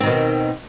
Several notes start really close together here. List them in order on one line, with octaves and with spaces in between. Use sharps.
C4 D#3 B2